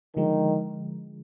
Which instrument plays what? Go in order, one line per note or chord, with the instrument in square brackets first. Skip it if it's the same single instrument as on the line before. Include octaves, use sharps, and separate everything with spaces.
[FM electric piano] D3 F3 G#3 [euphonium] D#3